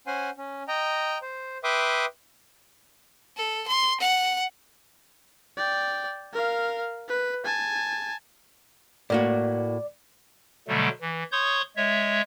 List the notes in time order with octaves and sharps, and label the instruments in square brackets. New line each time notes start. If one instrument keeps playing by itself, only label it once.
[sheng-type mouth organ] C#4 C5 F#5 G#5 C6
C#4
D#5 G5 A#5
C5
B4 E5 G5 C6 D6 D#6
[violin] A4
C6
F#5
[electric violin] D5 G5
A#4 F5
B4
G#5 A5
[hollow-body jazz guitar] A2 A#3 F#4 [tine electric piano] D5
[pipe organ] B2 D3 F#3 G3 A3
E3
C#5 C6 C#6 D#6 G6
G#3 C#5 E5